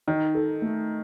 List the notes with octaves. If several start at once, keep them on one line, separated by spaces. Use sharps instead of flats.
D#3 D#4
A4
A3